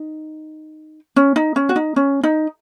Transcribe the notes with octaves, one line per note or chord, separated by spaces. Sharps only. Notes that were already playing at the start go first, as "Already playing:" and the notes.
Already playing: D#4
C#4
D#4
C#4
F#4
D#4
C#4
D#4